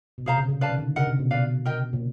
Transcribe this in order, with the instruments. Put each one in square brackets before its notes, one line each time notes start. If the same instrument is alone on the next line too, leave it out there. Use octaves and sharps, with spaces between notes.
[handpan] B2
[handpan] C3 [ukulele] G#4 C5 F5 A#5
[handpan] C#3
C#3
[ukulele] B4 D5 F5 A5
[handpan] D#3
D3
[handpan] C#3 [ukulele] A#4 D#5 F#5
[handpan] C3
B2
[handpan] B2 [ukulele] B4 D5 F5
[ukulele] A#4 D#5 G5
[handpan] A#2